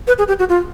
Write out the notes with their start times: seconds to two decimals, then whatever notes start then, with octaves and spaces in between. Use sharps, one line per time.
0.07 B4
0.18 G#4
0.28 G4
0.39 F#4
0.49 F4